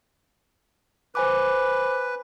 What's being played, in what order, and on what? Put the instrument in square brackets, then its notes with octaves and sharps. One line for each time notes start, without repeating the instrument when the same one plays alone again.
[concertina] B4 [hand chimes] C5 G#5 D6